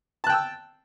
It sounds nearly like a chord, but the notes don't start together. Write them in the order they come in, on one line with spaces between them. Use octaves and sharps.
A5 F#6 G5 E6